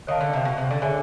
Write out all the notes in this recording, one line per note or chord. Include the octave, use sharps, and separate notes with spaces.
D#3 C#5 F5 A5
D3
C3
B2
C3
D3
D3 G#4 C#5 E5 G#5